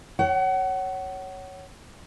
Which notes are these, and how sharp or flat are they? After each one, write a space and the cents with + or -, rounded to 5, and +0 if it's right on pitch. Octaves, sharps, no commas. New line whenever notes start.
C#5 +0 F#5 +30